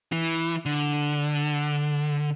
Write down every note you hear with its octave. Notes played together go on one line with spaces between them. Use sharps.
E3
D3